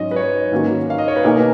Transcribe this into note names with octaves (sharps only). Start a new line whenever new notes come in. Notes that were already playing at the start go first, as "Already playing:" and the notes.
Already playing: G#2 F#3 C#4 D#5
B4
C#5
G#2 D#3 A#3 C#4 F#4
F5
D#5
C#5
B4
B2 A#3 D#4 G#4 A#4